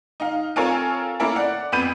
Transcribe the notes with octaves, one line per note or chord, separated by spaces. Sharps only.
D#4 F5
C4 F4 A4 A#4 C#5 G#5
A#3 C#4 E4 A4 A#4
D5 F#5
F2 B3 B5 G6 D#7